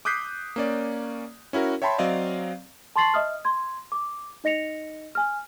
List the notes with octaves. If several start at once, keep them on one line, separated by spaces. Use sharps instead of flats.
D6 D#6 F#6 G6 B6 C7
A#3 C#4 D5
C#4 E4 F#4 A#4
C#5 E5 G5 A5 B5 C6
F#3 C4 D5 D#5 F5
A5 C6 C#6 A6 C7 F#7
D#5 E5 D#6 F6
C6 G#6
D6
D#4 D#5 A#6 C#7 F7
G#5 F6